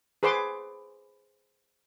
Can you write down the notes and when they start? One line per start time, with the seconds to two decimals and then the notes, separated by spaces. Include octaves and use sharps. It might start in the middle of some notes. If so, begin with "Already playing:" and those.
0.23 G#4 B4 C5 C6 D6